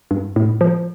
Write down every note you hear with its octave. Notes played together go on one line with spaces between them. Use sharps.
G2
A2
F3